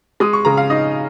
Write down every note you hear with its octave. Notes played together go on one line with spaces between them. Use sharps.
G#3 D#6
C#6
C#3 A#5
F5
D#4 D#5